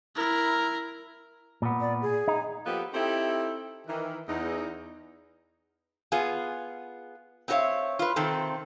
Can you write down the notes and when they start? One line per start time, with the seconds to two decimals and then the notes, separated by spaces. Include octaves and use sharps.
0.16 E4 A#4
1.62 A#2 B3
1.80 D5
2.02 G#4
2.28 D#4
2.66 F3 A#3 B3 G4 A4 B4
2.94 C4 D#4 E4 G4 A4
3.88 D#3 E3
4.28 E2 D#4
6.12 B3 F4 G#4
7.48 C4 D#4 F#4 C#5 E5 F5
7.99 F4 B4
8.16 C3 D#3 C4 A4